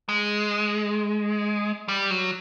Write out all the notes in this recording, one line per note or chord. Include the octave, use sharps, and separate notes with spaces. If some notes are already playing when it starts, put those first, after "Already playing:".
G#3
G3
F#3